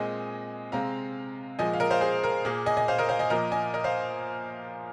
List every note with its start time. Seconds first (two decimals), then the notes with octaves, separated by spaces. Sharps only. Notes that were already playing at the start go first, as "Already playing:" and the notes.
Already playing: A#2 G#3 C4 D#5 G#5
0.72 C3 G#3 C4 F5 A#5
1.59 A#2 F3 G#3 D#5 G#5
1.73 F5
1.80 A#4 D#5
1.91 C5 F5
2.01 G#4 C5
2.24 A#4
2.45 A#2 A#3 G#4
2.66 D#5 G#5
2.77 D#5 G#5
2.88 C5 F5
2.98 A#4 D#5
3.09 C5 F5
3.19 D#5 G#5
3.30 A#2 F3 A#3 A#4 D#5
3.52 D#5 G#5
3.74 A#4 D#5
3.84 C5 F5